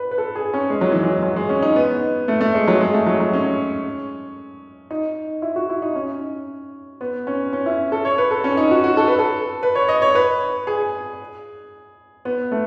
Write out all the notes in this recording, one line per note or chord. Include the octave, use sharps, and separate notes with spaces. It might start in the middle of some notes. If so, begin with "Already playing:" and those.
Already playing: B4
B4
A4
G#4
C#4
G#3
F#3
E3
F#3
F#3
G#3
C#4
D#4
B3
A3
A3
G#3
F#3
G#3
A3
F#3
F#3
C#4
D#4
E4
F#4
E4
D#4
C#4
B3
C#4
C#4
E4
A4
C#5
B4
A4
C#4
D#4
F#4
F#4
A4
B4
A4
B4
C#5
D#5
C#5
B4
G#4
B3
A3